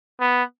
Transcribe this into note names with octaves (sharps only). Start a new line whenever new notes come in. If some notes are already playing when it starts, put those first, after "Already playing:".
B3